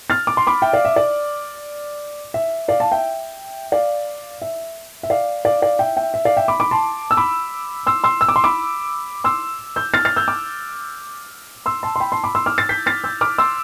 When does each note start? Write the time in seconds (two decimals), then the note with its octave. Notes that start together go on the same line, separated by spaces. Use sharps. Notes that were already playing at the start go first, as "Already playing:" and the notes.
0.10 F6 A6
0.27 D6
0.37 C6
0.47 B5 D6
0.62 E5 G5
0.73 D5 F5
0.85 E5
0.96 D5
2.34 E5
2.68 D5 F5
2.80 F5 A5
2.92 E5 G5
3.72 D5 F5
4.42 E5
5.03 E5
5.10 D5 F5
5.45 D5 F5
5.62 D5 F5
5.79 E5 G5
5.97 E5 G5
6.14 E5
6.25 D5 F5
6.37 E5 G5
6.48 B5 D6
6.60 B5 D6
6.71 A5 C6
7.11 E6
7.17 B5 D6
7.87 C6 E6
8.04 C6 E6
8.21 E6
8.28 D6
8.36 C6
8.44 B5 D6
9.24 C6 E6
9.76 E6 G6
9.94 F6 A6
10.05 F6 A6
10.16 E6 G6
10.28 D6 F6
11.66 C6 E6
11.83 A5 C6
11.96 C6
12.00 G5 B5
12.12 A5 C6
12.24 B5 D6
12.35 C6 E6
12.46 D6 F6
12.58 F6 A6
12.69 G6 B6
12.86 F6 A6
13.04 E6 G6
13.21 D6 F6
13.38 C6 E6